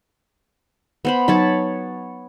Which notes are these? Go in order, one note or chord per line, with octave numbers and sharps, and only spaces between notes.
B3 C5 B5
F#3 D#4 C#5 A5 B5